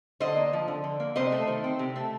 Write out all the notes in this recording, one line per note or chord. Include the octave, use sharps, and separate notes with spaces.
D3 C5 D#5
A#3
F3
D3
D3
A#3
C3 C5 D#5
A3
D#3
C4
C3
A3